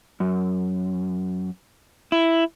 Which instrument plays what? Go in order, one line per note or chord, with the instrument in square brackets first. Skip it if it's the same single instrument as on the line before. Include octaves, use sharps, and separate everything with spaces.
[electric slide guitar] F#2
E4